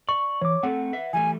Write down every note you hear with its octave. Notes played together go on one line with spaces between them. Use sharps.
D5 C#6
E3 C#5 D6
A3 C4 A4 F#5
B4 E5
E3 G3 A3 G#5